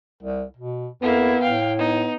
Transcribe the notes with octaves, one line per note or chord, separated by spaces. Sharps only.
C2
B2
F2 A#3 B3 E4
A2 F5 G5
B3 D#4